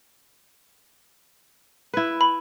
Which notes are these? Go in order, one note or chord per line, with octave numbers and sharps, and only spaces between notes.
E4 B4
B5